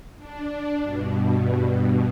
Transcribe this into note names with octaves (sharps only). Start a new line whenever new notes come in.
D4
G2 B2